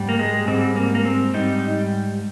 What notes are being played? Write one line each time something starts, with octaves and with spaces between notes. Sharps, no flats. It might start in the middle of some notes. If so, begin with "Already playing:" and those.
Already playing: G#2 G3
A#3
G#3
G#2 G3 C4
A#3
A#3
C4
G#2 G3 D#4